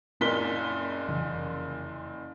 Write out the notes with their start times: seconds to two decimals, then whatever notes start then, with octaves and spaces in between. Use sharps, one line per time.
0.21 F#1 F#2 A#2 C4 B6 G7
1.08 F1 C#3 E3